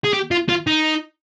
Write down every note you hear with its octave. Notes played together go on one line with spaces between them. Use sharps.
G#4
G4
F4
F4
D#4